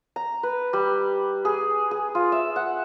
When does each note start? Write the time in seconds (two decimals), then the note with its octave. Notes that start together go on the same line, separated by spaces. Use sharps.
0.16 A#5
0.43 B4
0.73 G3
1.45 G#4
1.91 G#4
2.15 F4
2.32 E5
2.56 F#5